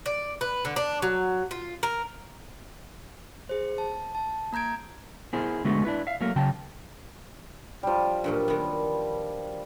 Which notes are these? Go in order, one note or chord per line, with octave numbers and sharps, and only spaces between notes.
D5
B4
D3
D4
F#3
F4
A#4
G#4 C5
A5
A5
A#3 A#5 G6 G#6 D7
B3 E4 G#4 A#4 C5
D3 G#3 A3 B3 F#4
D4 E4 B4
E5 F5
F#3 A3 A#3 A#4
C#3 F#3 G5 A5
F3 G3
G2 A#2 F#3
D#3 B3